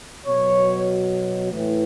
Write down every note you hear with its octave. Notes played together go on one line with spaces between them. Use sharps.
B2 F#3 C#5
A2 E3